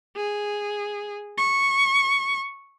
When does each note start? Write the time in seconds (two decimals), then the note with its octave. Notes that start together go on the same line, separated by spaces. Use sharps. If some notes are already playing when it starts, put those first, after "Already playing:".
0.17 G#4
1.38 C#6